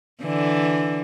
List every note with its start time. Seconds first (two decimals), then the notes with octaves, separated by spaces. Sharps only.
0.22 D3 E3